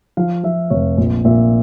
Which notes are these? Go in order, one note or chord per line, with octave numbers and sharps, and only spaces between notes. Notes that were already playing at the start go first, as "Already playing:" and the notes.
F3 F5
F3 E5
F1 C#5
A#1
A#2 E5